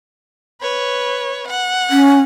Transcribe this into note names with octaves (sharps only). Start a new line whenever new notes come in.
B4 C#5
F#5
C#4